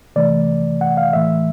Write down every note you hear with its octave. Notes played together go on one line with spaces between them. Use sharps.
C3 E3 A3 D5
F#5
F5
A2 E3 A3 E5